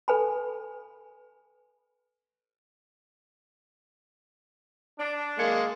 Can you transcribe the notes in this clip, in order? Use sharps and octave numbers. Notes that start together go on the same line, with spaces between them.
A4 B4 G#5 B5
D4
G#3 A#3 F5 G#6 C#7